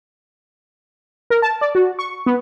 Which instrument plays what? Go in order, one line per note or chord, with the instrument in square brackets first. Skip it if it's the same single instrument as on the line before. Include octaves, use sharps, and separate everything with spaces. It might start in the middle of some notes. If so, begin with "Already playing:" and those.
[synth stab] A#4
A5
D5
F#4
C#6
B3